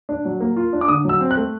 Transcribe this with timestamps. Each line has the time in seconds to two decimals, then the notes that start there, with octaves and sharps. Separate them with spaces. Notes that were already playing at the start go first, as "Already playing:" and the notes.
0.09 D4
0.25 F#3
0.40 A#3
0.56 F4
0.73 D4
0.81 D6
0.88 D3 D#6
1.04 F#3
1.09 E6
1.20 C4
1.31 F#6
1.37 A3